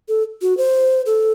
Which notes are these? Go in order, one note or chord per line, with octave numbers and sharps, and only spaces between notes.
A4
F#4
C5
A4